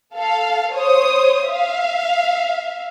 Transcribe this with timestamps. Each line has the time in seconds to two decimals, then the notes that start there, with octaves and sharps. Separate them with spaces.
0.16 A4 F5
0.74 C5 C#5 D#6
1.49 E5 F5